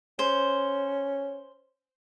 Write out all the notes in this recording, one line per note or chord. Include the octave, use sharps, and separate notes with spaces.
C#4 C5